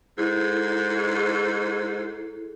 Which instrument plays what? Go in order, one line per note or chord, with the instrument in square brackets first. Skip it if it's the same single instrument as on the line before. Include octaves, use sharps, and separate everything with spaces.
[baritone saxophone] G#2 [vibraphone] E4 G#4 A4